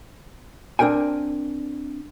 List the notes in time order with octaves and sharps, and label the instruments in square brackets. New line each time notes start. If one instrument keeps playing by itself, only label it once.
[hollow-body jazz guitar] C4 D4 A#4 G5 G#5